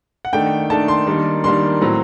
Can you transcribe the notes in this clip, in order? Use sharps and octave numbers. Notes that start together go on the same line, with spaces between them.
F#5
D#3 A3 D4 G5
D#3 A3 D4 A5
C6
D#3 G3 A#3 D4
D#3 G3 A#3 D4 C6
A2 F#3 C4